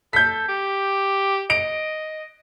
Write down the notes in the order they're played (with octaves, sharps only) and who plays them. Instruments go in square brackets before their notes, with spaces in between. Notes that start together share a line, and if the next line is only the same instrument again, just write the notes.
[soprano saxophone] A4 [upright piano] G6 B6
[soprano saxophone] G4
[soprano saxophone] D#5 [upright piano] D7